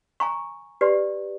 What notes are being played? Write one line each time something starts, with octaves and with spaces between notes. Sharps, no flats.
G#5 A#5 C#6
G4 B4 D5 C6